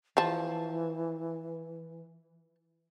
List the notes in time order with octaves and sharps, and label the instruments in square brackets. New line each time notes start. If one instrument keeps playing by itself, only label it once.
[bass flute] E3 [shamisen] F3 A5